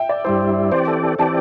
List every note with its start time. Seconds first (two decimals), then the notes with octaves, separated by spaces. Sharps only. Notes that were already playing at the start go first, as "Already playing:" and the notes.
Already playing: E5 G5
0.09 D5
0.25 G2 G3 E4 C5
0.72 E3 C4 G4 C5 D5
0.87 A4
1.03 A4
1.18 E3 C4 G4 D5 A5